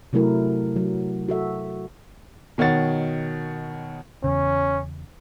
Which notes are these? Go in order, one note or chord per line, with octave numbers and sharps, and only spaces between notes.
C3 F#3 A3 E4 A#4
F#3
F#4 A4 E5
B2 D#3 C#5 F#5 A6
E2 C#3 C#4